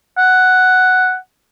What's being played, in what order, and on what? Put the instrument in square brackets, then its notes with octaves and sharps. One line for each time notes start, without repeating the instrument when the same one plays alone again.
[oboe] F#5